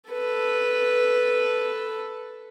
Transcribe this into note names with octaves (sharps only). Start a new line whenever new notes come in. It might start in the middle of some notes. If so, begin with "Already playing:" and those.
A4 B4